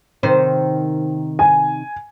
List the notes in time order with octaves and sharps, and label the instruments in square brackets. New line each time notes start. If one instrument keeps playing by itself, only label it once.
[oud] C3 D#3 C5
[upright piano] G#5